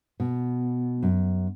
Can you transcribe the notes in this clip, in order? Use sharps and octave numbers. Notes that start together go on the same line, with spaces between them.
B2
F#2